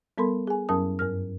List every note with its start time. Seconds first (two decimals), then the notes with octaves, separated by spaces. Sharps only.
0.18 G3 B3 A4 A#4 B5 C6
0.47 G#4 G#5
0.69 F#2 F#3 C#4 A#4 A5 D#6
0.99 G2 A#4 F6